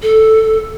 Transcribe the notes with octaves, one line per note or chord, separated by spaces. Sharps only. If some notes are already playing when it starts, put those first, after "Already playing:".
A4